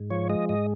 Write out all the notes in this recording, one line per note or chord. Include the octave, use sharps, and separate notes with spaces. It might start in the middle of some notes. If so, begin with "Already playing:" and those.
Already playing: G#2
F3 C#5
G#3 D#5
G#2 D#5